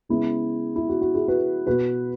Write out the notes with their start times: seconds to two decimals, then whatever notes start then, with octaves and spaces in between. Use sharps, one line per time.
0.09 C#3 G#3 B3 E4
0.76 E4
0.89 F#4
1.01 F#4
1.14 E4 G#4
1.28 F#4 B4
1.67 B2 B3 F#4 B4